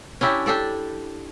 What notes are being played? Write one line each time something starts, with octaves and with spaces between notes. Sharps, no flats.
C#4 D4 E4 G4
D4 G4 A4 D5